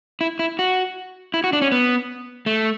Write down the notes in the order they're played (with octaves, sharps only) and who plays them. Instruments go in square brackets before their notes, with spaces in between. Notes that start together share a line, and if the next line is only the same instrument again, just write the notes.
[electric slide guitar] E4
E4
F#4
E4
F#4
D4
C#4
B3
A3